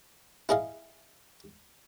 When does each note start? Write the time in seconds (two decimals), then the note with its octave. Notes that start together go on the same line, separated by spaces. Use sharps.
0.49 E4 G#4 D#5 F5